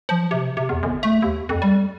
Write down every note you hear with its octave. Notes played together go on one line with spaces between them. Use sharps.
F3
C3
C3
E2
G1
A3
D#2
F2
G3